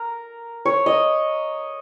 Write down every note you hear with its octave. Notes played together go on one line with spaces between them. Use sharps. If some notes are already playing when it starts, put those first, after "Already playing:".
Already playing: A#4
C#5
D#5